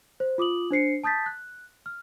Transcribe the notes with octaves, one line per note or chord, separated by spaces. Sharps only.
C5
F4 D6 D#6 F#7
D4 C5 C7 C#7
A5 D#6 G6 A6 B6
F#6
F6